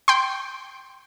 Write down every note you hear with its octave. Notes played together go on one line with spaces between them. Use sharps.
G5 C6